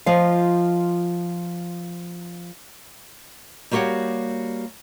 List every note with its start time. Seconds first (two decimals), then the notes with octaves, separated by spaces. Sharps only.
0.06 F3 F4 D#5 F5
3.71 G3 A#3 F#4 G4 C#5 F#5